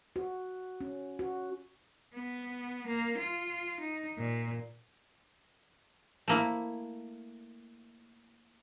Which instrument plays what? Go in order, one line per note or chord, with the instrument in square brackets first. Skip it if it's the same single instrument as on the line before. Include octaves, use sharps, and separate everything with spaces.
[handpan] F#4
C#4
F#4
[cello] B3
A#3
F4
D#4
A#2
[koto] A3 A#3 E4